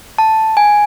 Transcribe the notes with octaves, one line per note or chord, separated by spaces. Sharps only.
A5
G#5